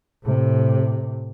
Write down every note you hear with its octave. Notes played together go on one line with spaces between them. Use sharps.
A2 C3